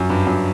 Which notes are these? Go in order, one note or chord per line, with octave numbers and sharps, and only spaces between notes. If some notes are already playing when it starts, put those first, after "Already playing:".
Already playing: F#2
G2
F#2